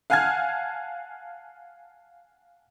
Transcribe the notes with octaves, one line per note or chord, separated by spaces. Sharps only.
F5 F#5 G#5 A5 F6 G#6